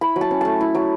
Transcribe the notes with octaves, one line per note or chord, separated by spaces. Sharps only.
E4 B5
F#3
A5
C#4
A3 A5
E4
F#3